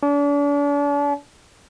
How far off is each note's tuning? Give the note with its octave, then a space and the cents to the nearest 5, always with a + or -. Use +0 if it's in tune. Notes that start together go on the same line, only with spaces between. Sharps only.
D4 -40